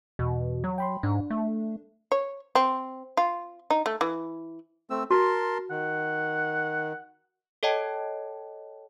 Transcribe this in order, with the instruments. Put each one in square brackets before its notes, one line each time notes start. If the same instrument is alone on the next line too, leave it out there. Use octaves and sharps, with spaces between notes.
[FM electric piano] E2 [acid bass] B2
[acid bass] F#3
[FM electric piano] G5 B5 C6
[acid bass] G#2 [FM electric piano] D4
[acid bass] A3
[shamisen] C#5
C4
F4
D#4
A3
E3
[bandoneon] A3 C4 E6
[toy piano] F#4 [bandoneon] A#4 A5 C6
[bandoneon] D#3 [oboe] F#5
[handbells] A4 C#5 D#5 G5 A5